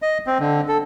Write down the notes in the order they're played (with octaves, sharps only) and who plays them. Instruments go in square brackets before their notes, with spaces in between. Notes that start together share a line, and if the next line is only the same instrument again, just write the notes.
[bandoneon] D#5
C4
D3
A4